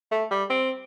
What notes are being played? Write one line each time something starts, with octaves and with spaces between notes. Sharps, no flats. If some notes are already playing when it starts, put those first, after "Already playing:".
A3
G3
C4